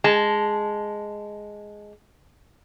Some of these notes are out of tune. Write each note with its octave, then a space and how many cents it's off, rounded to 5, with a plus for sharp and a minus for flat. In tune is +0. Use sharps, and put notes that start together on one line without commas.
G#3 +0 A5 -10